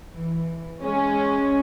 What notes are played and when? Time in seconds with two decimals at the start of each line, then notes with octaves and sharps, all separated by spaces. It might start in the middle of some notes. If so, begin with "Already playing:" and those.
0.14 E3
0.83 G#3 C#4